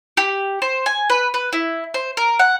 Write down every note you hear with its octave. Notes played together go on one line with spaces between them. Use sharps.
G4
C5
G#5
B4
B4
E4
C5
A#4
F#5